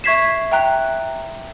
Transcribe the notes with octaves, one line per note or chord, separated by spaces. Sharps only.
E5 C#6 G#6 B6 C7 E7
E5 G5 A#5 F#6